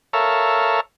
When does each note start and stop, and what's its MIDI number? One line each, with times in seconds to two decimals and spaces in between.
0.13 0.80 69
0.13 0.80 70
0.13 0.80 73
0.13 0.80 76
0.13 0.80 77